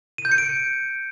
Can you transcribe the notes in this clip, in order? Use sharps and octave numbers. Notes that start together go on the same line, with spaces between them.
D#7
G6
C#7
D7